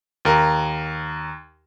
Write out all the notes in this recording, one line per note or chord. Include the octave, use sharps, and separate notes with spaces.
D#2 A#4